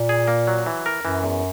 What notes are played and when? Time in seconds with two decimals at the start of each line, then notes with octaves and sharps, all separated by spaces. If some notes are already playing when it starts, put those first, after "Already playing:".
Already playing: A#2
0.09 G#4
0.28 A#3
0.47 F#3
0.66 E3
0.86 A#4
1.05 F#2 E3
1.24 E2